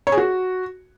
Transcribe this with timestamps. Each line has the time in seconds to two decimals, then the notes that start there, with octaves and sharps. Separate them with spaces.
0.07 C#5
0.12 G#4
0.17 F#4